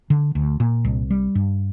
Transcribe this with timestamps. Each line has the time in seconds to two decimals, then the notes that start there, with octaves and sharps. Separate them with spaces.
0.10 D3
0.35 D2
0.60 A#2
0.85 C2
1.10 G3
1.35 G2